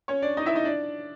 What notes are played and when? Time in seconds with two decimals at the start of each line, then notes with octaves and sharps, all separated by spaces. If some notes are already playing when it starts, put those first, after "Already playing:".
0.08 C#4 C#5
0.22 D4 D5
0.37 D#4 D#5
0.46 E4 E5
0.55 D#4 D#5
0.65 D4 D5